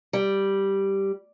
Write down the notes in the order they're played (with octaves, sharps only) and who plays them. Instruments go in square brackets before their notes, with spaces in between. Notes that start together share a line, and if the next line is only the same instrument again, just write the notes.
[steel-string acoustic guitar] G3